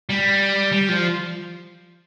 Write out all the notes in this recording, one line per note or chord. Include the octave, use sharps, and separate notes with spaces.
G3
G3
F3